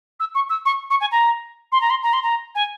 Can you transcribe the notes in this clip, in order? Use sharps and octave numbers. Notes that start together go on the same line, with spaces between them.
E6
C#6
E6
C#6
C#6
G#5
A#5
C6
A#5
C6
A#5
C6
A#5
G#5